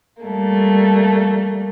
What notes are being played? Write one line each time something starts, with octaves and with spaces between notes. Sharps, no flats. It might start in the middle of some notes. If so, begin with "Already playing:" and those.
G3 A3 A#3